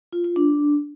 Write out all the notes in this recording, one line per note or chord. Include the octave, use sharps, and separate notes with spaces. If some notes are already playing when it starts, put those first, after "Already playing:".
F4
F4
D4